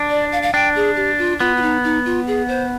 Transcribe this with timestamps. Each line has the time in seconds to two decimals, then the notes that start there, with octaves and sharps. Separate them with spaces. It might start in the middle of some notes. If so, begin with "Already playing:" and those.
Already playing: D4
0.10 D5
0.32 F5
0.42 F5
0.54 D4 G5
0.76 G#4
0.96 G4
1.18 F4
1.40 B3 F4
1.57 F4
1.62 D#4
1.84 D#4
2.05 F4
2.27 G#4
2.48 C5